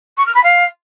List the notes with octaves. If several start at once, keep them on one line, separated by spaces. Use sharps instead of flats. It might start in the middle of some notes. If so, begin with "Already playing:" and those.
C#6
F6
B5
F5